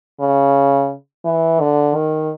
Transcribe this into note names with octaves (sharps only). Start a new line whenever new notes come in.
C#3
E3
D3
D#3